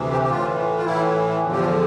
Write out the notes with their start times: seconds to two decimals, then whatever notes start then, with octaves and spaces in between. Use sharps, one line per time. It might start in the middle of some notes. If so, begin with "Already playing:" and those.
Already playing: D2 C3 E3
0.12 G4
0.23 G4
0.30 A2 E3 F4
0.78 F4
0.85 A2 E3 E4
1.41 E2 D3 F3
1.52 G4
1.60 F4